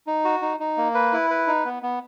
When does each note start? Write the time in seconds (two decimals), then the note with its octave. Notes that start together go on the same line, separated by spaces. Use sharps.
0.07 D#4
0.25 F#4
0.42 D#4
0.60 D#4
0.77 A#3
0.95 B4
1.13 E4
1.30 B4
1.47 D#4
1.65 B3
1.83 B3